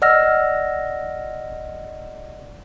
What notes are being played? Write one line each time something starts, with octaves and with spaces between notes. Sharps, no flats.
D5 D#5 F#5 E6 F6 A#6